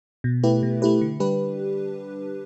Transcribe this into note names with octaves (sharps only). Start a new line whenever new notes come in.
B2
A3 E4 G4 B4
B2
A3 E4 G4 B4
D3
G3 D4 G4 B4